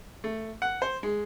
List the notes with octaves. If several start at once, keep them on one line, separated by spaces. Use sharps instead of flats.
A3
F#5
C5
G#3